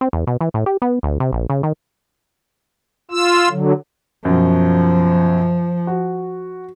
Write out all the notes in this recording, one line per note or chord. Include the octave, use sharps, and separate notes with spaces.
C4
E2
B2
E3
A2
G4
B3
D2
C3
A#1
C#3
D#3
F4 E6
D3 F#3
F#2 B2 F3
F#4